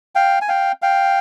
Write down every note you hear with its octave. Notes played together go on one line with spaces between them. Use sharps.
F5 G5
G#5
F5 G5
F5 G5